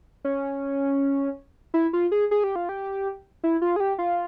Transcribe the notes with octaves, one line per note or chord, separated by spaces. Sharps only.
C#4
E4
F4
G#4
G#4
G4
F4
G4
E4
F4
G#4
G4
F4